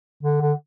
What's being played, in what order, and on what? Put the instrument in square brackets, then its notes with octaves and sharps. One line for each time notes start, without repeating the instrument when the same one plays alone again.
[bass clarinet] D3
D3